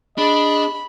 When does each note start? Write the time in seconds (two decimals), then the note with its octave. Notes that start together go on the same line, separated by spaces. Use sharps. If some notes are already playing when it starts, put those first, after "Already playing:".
0.18 D4 G#4 D#5 B5